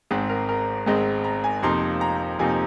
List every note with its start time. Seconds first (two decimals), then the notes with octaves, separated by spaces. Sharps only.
0.11 G#1 G#2 G#3 C4 G#4
0.29 A#4
0.49 A#4
0.86 G#1 G#2 G#3 C4 D#5
1.24 A#5
1.44 G#5
1.63 F2 C3 F3 A#3 D#4 C6
2.01 A#5
2.39 F2 C3 F3 A#3 D#4 G#5